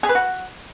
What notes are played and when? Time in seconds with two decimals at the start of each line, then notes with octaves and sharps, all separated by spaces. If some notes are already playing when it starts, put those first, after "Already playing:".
0.03 G#4
0.09 B4
0.15 F#4